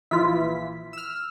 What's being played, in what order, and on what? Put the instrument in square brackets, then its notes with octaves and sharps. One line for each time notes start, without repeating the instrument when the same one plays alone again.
[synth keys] A#1 E3 B6 [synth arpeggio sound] E4 F4
[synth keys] E6 F6